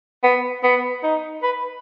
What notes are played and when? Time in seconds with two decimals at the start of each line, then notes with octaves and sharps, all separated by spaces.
0.23 B3
0.64 B3
1.03 D#4
1.43 B4